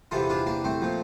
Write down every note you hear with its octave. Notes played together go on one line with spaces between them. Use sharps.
E2 C3 E3 F4 A4
D4 F4
A#3 D4
A3 C4
A#2 F3